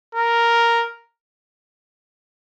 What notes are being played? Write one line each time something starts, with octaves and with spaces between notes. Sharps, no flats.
A#4